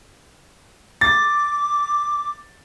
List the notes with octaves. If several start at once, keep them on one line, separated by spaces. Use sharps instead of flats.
D6 A6